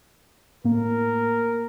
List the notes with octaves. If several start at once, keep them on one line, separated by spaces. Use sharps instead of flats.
A2 A#3 A#4